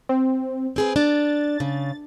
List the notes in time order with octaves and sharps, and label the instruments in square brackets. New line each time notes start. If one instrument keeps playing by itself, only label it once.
[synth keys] C4
[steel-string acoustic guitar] C4 G#4 B4
[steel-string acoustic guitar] D4 [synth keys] A6
[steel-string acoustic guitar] C#3